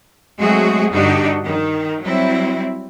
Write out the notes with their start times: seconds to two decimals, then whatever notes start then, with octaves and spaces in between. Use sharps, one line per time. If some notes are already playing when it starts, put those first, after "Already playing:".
0.39 F#3 G#3 A3 C4 F#4 G#4
0.91 G2 D3 D4 D#4 F#4 G4
1.45 D#3
2.02 F#3 G3 C4 E4